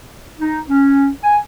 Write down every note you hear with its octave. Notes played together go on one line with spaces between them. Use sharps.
D#4
C#4
G#5